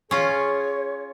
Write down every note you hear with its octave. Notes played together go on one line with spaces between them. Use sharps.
C#4 F4 G#4 C#5